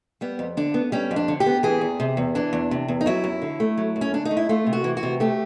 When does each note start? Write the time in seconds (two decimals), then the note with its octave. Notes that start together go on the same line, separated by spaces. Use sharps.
0.21 G3 B3
0.39 F2
0.57 D3 D4
0.74 B3
0.92 G3 C#4
1.11 F2
1.16 D4
1.28 D3
1.40 G4
1.46 B3
1.63 E3 G#4
1.81 E2
2.00 C3
2.17 E2
2.35 E3 D4
2.53 E2
2.71 C3
2.88 E2
3.01 D#4
3.06 F#3 E4
3.24 F#2
3.42 D3
3.60 A3
3.77 F#3
3.96 F#2
4.01 C#4
4.13 D3 D4
4.25 D#4
4.31 A3
4.37 E4
4.49 A3 F4
4.67 C3
4.73 F#4
4.84 E3
4.97 F#4
5.03 C3
5.20 A3 G4